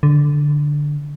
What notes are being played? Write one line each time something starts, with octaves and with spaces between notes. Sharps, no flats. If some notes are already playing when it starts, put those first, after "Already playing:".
D3